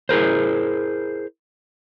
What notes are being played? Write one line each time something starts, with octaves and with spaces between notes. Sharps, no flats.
E4 G#4 A#4 C5